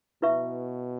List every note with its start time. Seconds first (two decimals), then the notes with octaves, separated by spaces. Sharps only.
0.22 B2 E4 B4 E5 C#6